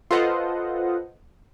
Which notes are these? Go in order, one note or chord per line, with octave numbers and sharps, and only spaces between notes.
F4 A4 B4 C5 D#5 F#5